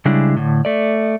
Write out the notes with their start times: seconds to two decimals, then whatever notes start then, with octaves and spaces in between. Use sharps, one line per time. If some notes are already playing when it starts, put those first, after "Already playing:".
0.05 C#3 G3 G#3 D4 E4
0.37 A2 D3
0.65 A3 D5